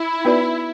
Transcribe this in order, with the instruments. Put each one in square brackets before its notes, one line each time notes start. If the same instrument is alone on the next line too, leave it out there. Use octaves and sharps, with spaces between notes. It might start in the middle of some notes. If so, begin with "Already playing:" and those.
Already playing: [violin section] E4
[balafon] B3 D#4 F#4 B4 D5